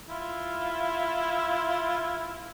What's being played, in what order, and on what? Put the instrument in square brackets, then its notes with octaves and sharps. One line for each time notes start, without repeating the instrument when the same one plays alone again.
[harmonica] E4 F4